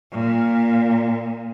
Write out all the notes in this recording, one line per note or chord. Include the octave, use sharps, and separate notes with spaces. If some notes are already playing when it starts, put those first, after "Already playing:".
A#2